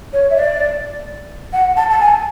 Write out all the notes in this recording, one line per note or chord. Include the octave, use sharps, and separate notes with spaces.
C#5
E5
D5
F#5
A5
A5
G#5